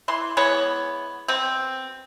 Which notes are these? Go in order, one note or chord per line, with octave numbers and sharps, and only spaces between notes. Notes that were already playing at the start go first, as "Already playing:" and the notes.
E3 C6
E3 G#3 B3 C#5
B2 C4